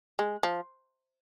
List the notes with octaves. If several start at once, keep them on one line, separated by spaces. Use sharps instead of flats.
G#3
F3